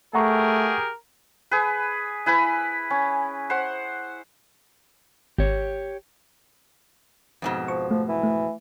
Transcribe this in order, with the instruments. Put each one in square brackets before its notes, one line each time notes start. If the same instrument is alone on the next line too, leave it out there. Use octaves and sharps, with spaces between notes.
[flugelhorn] A3 [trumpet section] G4 G#4 A#4 [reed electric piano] F#5 A#5 C#6
[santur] G#4 B4
E4 B4 G#5 B5
C#4
C5 F#5
[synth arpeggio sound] G#1 [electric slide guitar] G4 C#5
[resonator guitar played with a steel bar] F2 G#2 B2
[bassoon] F3 [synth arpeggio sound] C#6
[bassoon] F3 [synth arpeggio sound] A3
[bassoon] E3
[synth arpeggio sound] A3